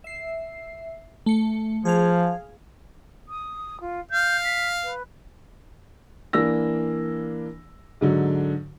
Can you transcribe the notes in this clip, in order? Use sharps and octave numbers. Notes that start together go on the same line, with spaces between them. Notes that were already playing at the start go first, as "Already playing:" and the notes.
E5 C7
A3 C#7
F3 G#4 F5
D#6
F4
F5 G6
B6
B4
E3 A#3 D4 E6 A#6
G#2 D3 F#3